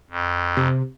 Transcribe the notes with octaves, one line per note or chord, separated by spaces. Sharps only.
F2
C3